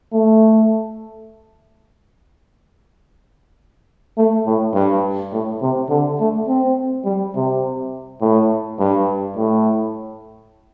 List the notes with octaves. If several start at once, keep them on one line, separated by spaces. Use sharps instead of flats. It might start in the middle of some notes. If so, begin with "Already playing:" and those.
A3
A3
A2
G2
A2
C3
D3
A3
C4
G3
C3
A2
G2
A2